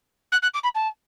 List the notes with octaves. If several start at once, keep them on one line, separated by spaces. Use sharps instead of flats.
F#6
F#6
D6
B5
A5